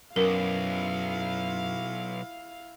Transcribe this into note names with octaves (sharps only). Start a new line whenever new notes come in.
B1 F#2 E4 A#4 F5